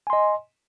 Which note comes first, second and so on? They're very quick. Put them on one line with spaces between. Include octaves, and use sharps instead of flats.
G#5 C6 D#5